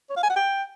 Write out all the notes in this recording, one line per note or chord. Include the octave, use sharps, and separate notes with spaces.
C#5
F5
G#5
F#5
G5